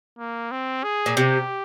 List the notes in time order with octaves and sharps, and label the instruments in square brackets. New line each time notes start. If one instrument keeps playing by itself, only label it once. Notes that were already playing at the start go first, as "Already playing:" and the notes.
[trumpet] A#3
C4
G#4
[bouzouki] A#2
[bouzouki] C3 [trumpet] G4